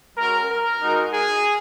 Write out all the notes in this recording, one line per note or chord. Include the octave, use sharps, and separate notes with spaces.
G#3 C#4 F#4 A#4
A#4
G#3 D#4 F#4
G#4